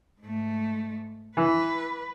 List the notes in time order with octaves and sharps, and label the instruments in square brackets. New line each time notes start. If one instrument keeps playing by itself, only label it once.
[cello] G#2 A3
[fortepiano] E3 [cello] B4